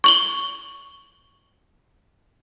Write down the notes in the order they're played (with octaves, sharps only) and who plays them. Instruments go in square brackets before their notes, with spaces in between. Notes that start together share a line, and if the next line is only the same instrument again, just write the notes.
[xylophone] C#6 F#7 G7